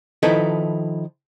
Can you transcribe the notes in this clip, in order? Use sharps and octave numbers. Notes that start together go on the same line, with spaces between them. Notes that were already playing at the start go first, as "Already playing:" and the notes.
D#3 F3 D#4 E4 A4 B4